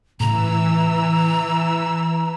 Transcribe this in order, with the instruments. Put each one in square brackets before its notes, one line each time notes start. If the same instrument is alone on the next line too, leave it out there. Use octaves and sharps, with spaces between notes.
[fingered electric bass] A2 C#3 [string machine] E3 E6 [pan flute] A#5